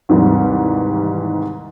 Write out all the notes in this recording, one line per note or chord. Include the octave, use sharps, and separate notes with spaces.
D#2 G#2 C3 D#3 E3 G3